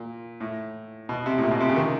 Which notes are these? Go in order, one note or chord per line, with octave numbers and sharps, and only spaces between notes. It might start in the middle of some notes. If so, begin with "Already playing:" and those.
Already playing: A#2
A2
B2
C3
A2
A#2
B2
C3
C#3
D#3